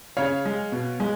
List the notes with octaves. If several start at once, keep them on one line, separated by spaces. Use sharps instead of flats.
C#3 C#5 F5
G#3
B2
G#3